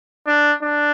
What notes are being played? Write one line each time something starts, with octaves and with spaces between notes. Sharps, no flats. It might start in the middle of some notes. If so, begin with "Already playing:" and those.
D4
D4